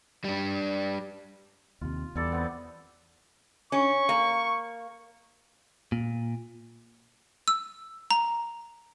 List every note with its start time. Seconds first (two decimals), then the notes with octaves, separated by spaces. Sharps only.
0.24 G3 D4
1.81 D#2 C3 F4
2.16 E2 G3 A4 D5
2.32 B3 C4
3.72 C#4 C#6
4.09 A#3
5.92 A#2
7.48 E6
8.11 A#5